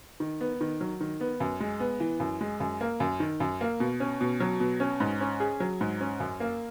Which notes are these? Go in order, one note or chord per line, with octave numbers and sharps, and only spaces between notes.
D#3
B3
D#3
F#3
D#3
B3
F#2
G#3
B3
E3
F#2
G#3
F#2
A#3
F#2
D#3
F#2
A#3
B2
C#4
B2
F#3
B2
C#4
G#2
C#4
G#4
F#3
G#2
C#4
F#2
A#3